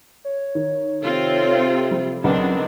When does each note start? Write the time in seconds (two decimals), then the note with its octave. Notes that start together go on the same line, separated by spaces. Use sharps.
0.25 C#5
0.55 D#3
1.04 C3 C4 F4 A4
1.91 F3 G3
2.24 C#2 D#3 F#3 C4 D4 B4 F#5